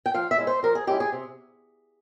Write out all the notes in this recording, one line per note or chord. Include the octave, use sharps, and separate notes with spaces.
G5
F3 F5
E5
G#3 C#4 E4
C5
F3 A#4
G#4
G#3 C#4 E4 G4
G#4
C3